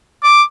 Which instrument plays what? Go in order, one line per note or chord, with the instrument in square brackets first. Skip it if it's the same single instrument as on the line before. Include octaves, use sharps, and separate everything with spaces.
[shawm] D6